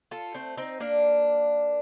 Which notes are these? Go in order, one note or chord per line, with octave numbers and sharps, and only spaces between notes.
F4 A4
A3 C4
C4 D#4
A#3 D4